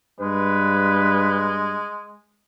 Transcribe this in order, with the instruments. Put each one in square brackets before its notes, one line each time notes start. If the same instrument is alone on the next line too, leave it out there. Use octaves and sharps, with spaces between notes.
[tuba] G2 [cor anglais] G#3 [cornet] B4